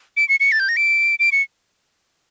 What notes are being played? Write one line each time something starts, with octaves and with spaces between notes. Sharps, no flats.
D7
C#7
C#7
A6
G6
A#6
D7
D7
C#7